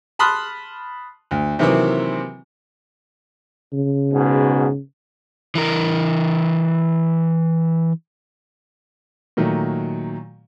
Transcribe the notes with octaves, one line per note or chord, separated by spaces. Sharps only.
A5 B5 C6 D#6 F6 F#6
D2
C3 D#3 E3 F#3 A#3 C4
C#3
G#2 B2
E3 A#4
A#2 D#3 F#3 A3